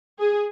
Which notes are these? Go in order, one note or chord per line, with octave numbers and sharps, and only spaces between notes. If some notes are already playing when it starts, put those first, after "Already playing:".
G#4